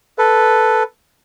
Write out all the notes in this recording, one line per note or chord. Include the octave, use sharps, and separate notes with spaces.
A4 B4